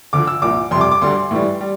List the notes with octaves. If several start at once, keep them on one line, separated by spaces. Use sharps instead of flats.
D2 D3 F3 D6
E6
C2 A#2 F3 D6
F2 C3 G3 C6
D6
D6
D2 D3 G3 C6
A2 E3 G3
G3